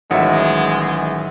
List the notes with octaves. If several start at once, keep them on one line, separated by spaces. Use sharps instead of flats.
A1 D#3 F#3 G#3 E5 F#5